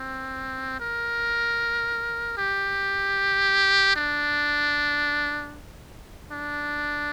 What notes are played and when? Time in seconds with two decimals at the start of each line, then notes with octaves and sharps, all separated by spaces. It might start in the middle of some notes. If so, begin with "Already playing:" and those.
Already playing: C4
0.80 A#4
2.37 G4
3.96 D4
6.32 D4